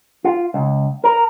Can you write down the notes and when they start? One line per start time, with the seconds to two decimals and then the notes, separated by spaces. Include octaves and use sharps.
0.24 F4
0.54 C#2
1.04 A#4